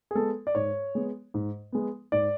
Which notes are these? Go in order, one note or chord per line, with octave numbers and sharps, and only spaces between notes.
G#4
G#3 B3 A4
D5
G#2 C#5
G#3 B3
G#2
G#3 B3
G#2 D5